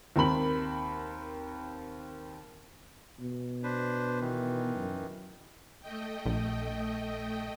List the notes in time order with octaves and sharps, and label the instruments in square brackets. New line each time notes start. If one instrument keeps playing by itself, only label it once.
[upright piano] D#2 C4 A#4 B5 F#7
[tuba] B2
[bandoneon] D4 B4 C5
D#3 E3
[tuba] F#2
[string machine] A3 D#5 G5
[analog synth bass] A#1